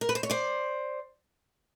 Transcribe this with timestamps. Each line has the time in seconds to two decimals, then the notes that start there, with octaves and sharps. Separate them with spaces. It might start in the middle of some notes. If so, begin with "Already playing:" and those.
0.01 A#4
0.09 B4
0.15 C5
0.23 C#5
0.30 C5 D5